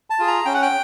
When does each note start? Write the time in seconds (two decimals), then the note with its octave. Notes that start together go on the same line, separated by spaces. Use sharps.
0.10 A5
0.19 F4 G#4
0.27 A#5
0.45 C#4 G5
0.54 F#5
0.62 G5